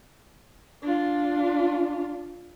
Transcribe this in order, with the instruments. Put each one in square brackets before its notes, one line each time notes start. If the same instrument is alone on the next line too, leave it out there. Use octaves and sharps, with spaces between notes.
[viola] D4 F4